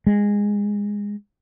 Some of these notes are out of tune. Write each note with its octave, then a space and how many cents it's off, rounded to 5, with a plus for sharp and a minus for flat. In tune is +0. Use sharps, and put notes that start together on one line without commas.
G#3 -15